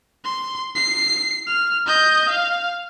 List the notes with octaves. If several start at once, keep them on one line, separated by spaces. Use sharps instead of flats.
C6
C7
F6
D#5 G6
F5